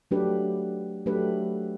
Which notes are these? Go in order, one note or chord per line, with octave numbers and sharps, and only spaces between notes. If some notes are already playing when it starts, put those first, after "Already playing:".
F#3 A3 D4 G4 B4
F#3 A3 D4 G4 B4